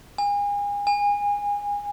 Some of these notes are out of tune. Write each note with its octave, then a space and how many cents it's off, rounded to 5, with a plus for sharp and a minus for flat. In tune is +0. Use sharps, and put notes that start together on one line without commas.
G#5 -35
G#5 -25